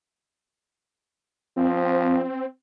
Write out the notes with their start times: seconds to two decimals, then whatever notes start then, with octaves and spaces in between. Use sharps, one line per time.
1.57 F3 C4